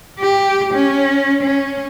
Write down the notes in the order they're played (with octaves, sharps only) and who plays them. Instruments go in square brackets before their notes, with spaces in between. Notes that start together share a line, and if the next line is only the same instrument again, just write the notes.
[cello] G4
C#4
C#4